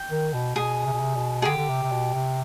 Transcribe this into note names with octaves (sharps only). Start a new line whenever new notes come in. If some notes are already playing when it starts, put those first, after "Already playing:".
Already playing: G5
D#3
B2
B2 G#4
C3
B2
C3
B2
G#4
D3 G4
D3
C3
C3
B2
C3